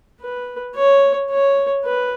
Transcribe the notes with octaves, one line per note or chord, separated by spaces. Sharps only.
B4
C#5
C#5
B4